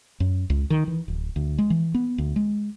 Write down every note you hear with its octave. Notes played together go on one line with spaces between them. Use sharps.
F#2
C#2
D#3
E3
D1
D2
G#3
E3
B3
D2
G#3